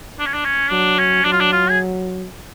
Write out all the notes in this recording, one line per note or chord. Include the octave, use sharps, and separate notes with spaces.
D4
C#4
D4
C#4
F#3 D4
C#4
F#3 D4
F4
D4
F4
G#4